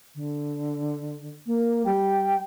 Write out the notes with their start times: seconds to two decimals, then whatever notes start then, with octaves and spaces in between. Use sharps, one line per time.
0.15 D3
1.46 A#3
1.85 G3 G5